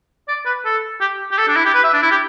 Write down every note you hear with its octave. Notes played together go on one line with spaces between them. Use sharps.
D5
B4
A4
G4
G4
A4
D4
E4
G4
B4
E5
D4
E4
G4